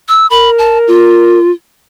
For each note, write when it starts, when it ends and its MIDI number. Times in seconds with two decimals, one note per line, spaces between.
0.09 0.27 88
0.30 1.38 70
0.30 0.50 83
0.58 0.78 81
0.88 1.52 65